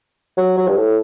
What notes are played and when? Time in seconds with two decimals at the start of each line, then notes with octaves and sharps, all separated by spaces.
0.38 F#3
0.58 F#3
0.68 G2
0.77 A2